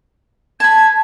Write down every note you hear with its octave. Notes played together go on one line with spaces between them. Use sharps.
A5 B5 G#6